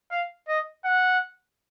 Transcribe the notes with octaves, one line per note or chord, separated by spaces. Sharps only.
F5
D#5
F#5